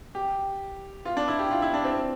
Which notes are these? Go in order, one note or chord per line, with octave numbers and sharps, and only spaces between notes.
G4
F4
D4
E4
G4
F4
E4
D4
C4